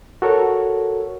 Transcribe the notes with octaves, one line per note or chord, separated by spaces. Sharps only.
F#4 A4 A#4 C#5